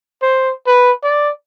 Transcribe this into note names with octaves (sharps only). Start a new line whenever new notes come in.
C5
B4
D5